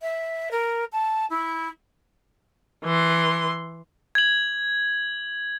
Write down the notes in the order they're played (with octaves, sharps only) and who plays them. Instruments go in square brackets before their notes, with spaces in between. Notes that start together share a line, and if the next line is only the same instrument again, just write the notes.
[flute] E5
A#4
A5
E4
[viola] E3 C6
[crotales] G#6 F#7